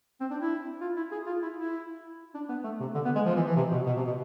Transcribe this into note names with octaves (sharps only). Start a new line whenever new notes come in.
C4
D4
E4
F4
E4
G#4
F4
E4
E4
D4
B3
A3
C3
D3
B3
G#3
F3
E3
E3
C3
B2
B2
C3
B2